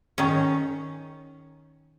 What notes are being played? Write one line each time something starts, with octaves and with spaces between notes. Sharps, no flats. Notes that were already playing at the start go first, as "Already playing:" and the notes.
D#3 C#4